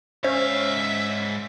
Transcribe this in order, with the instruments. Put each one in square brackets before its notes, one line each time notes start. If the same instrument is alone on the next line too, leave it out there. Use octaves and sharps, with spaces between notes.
[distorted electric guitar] G#2 F5 [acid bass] C#4 [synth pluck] C5 [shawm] E5